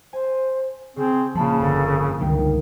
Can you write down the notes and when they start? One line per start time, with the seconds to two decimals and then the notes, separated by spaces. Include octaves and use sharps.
0.13 C5 G#5
0.96 C#3 C4 G#4
1.35 C#3 F3 A3 A#3 F4 A5 B5
1.60 G1 F2 D3 A#3 A4
2.21 C#2 G2 D3 D#3 G5